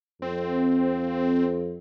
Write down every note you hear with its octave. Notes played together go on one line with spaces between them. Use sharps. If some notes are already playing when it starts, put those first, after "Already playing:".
F2 C4